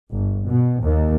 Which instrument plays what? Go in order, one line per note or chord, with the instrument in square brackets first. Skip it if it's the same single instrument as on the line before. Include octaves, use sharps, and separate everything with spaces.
[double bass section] G1
B2
D#2